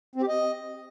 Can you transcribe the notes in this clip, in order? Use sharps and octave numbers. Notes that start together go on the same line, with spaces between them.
C4
G4
D#5